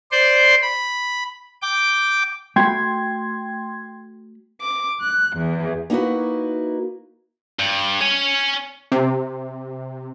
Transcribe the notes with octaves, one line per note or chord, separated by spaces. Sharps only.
C5 D5 C6
B5
G5 D6
A3 F#4 G5 B5 C6 G#6
D6
F#6
E2
A#3 D#4 E4 F#4 B4
G2
C#5 G#5
C3